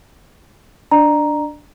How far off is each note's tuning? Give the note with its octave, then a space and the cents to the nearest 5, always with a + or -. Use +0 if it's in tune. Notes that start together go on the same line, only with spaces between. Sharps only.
D4 +0 D5 +35 A#5 +5